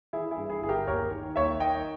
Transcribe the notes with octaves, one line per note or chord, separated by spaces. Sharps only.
E3 E4 G#4
E4 G#4
G2
E4 G#4
G1 G#4
G4 A#4
D#2 A#4 C#5
D#3
D#2 C#5 E5
D#3 D#5 G5